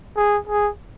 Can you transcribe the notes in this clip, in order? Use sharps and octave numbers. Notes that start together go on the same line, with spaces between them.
G#4
G#4